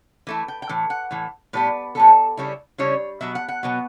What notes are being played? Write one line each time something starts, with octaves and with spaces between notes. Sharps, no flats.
E3 A3 E4
G5
G5
A2 E3
F#5
A2 E3
A2 G3 B3 B4
A2 G3 B3 A4
C#3 G3 C#4 E4
C#3 G3 C#4 E4 C#5
B2 F#3 B3 E5
F#5
F#5
B2 F#3 B3